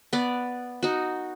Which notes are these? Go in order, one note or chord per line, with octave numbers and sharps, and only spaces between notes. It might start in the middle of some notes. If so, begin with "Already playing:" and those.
B3 D5
D#4 F#4